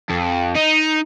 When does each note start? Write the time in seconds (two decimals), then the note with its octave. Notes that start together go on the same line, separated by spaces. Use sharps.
0.10 F2
0.55 D#4